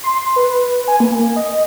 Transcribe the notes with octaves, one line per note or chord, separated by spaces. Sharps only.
C6
B4
G#5
A#3
D#5